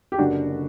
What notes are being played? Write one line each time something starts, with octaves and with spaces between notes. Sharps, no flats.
G4
F#1 F#2 D3 D4 F#4
D3